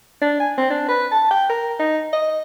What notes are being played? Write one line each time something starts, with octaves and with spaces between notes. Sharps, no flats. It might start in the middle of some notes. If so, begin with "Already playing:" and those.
D4
G#5
C4
D4
B4
A5
G5
A#4
D#4
D#5